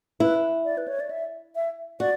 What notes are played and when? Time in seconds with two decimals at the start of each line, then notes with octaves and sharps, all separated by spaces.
0.20 E4 B4
0.65 D5
0.78 B4
0.88 C#5
1.00 D5
1.10 E5
1.55 E5
2.00 F#4 D5